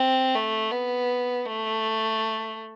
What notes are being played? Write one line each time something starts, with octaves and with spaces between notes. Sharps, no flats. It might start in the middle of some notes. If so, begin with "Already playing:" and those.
Already playing: C4
A3
B3
A3